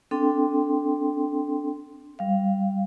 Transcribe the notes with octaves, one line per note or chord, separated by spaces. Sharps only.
C4 D4 A4 G5 C6
G3 F5